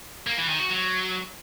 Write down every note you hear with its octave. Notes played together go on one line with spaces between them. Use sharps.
A#3
E3
D#3
F#4
F#3